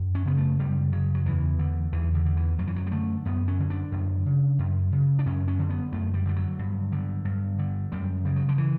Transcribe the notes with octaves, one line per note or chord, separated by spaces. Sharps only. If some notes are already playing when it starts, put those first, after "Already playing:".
Already playing: F#2
C#4
C#3 B3
A3
F#2 G3
C#3 F#3
F#3
E2 E3
D3
E2 E3
D3
D3
E3
F#2 F#3
E3
F#3
G3
D3 A3
F#2 B3
C#4
D3
D4
F#2
C#3
F#2
C#3
D4
F#2 C#4
C#4
D3
B3
F#2 A3
G3
D3 G3
F#3
G2
D3
G2
D3
F#2 G3
C#3 G3
F#3
D3
E3